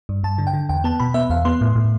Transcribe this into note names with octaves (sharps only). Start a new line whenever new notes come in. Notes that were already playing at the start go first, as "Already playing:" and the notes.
G2
G2 A5
D3
G5
D3
E2 G5
B3 A5
B2 B5
B3 E5
E2 F5
B3 C6
A2
A2